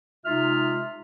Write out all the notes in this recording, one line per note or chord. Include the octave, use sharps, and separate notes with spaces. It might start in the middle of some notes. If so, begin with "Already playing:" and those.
C3 G#3 D#4 F4 E5 F6